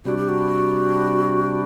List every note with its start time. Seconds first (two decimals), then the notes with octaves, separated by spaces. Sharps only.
0.05 C3 G3 D4 F#4
0.17 G4
0.29 F#4